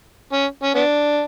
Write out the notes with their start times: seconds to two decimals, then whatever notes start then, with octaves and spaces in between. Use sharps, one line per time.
0.33 C#4
0.63 C#4
0.75 B3 D4